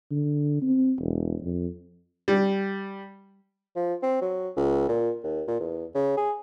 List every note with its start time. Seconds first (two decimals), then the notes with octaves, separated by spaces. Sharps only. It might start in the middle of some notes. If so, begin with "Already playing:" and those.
0.11 D3
0.62 C4
1.00 E1
1.43 F2
2.28 G3
3.76 F3
4.03 C4
4.21 F#3
4.56 C#2
4.89 A#2
5.23 D#2
5.47 A#2
5.60 E2
5.95 C#3
6.17 G#4